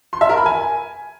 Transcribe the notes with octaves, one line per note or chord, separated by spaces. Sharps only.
C6
E5
A#4
B5
G#5